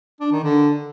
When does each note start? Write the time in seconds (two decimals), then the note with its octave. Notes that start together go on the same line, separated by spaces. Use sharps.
0.20 D4
0.32 D#3
0.44 D3